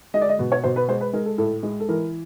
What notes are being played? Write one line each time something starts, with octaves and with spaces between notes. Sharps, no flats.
G#3 D#5
D5
D#5
B2
C#5
B2 C5
B4
G#3 C5
B4
G#3 A#4
A4
A2 A4
G#3
A4
E3 A#4